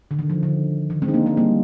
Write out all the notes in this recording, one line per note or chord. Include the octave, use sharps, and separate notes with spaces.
D3
D#3
F3
D3
D#3
G#3 C4
D#4
A#3 D4
G#3 C4
G3 A#3